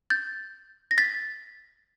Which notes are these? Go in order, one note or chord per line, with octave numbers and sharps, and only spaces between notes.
G6 A6
A#6
A6 B6